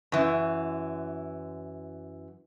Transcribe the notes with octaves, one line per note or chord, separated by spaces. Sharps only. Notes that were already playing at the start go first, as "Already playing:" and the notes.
F#2 E3